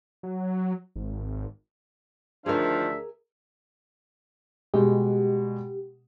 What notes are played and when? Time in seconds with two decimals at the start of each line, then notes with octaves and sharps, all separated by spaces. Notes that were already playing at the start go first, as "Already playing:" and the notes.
0.23 F#3
0.96 G#1
2.46 D2 D#3 F3 D4 G#4 A#4 E5
4.74 B2 G3 G#3 G4